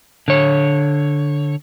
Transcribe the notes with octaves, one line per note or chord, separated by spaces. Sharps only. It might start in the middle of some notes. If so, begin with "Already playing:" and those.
D3 C#5